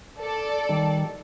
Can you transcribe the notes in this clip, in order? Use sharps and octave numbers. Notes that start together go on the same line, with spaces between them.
A4 D5
D#3 G3